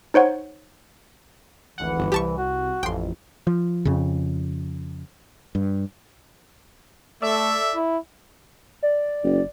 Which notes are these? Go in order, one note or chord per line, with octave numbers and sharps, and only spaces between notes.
D#4 C5 C#5 F#5
G#1 D2 E3 F#5
G1
C2 G4 A5 C#6
F#4
A1 F2 G5 C6
F3
F2 C#3
G2
A3 A4 D5 E5
E4
D5
F#1